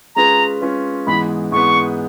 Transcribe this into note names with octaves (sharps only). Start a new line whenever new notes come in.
G#3 C#4 F4 G#4 B4 A#5
G#3 C#4 F4 G#4 B4
G#2 E3 G#3 B3 B5
G#2 E3 G#3 B3 C#6